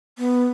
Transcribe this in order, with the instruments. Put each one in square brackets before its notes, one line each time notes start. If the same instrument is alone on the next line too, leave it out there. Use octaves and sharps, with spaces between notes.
[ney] B3